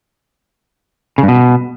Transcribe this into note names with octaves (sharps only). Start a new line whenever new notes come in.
C#3
G2
B2